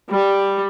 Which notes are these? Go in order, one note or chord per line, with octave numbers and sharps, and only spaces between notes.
G3